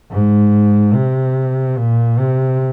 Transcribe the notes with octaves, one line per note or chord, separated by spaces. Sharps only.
G#2
C3
A#2
C3